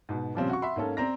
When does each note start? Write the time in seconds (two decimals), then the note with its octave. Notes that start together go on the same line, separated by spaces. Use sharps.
0.09 G#2 B2
0.35 A#2 C#3 F3 G3 C4 C#4
0.50 F#4 C#6
0.62 E5 F#5 B5 C6
0.76 G#2 A#3 C#4 A4
0.97 C4 D5 A#5 A#6